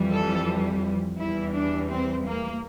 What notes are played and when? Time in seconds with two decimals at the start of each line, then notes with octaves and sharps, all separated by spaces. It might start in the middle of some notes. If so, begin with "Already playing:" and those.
Already playing: F2 E3 G3
0.12 A4
1.18 E2 E3 G3 E4
1.53 D4
1.89 C4
2.24 A#3